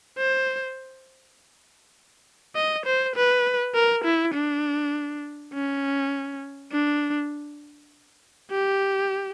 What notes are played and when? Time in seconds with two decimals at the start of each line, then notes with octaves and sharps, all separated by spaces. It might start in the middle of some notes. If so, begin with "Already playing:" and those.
0.18 C5
2.55 D#5
2.86 C5
3.15 B4
3.75 A#4
4.04 E4
4.35 D4
5.53 C#4
6.72 D4
8.51 G4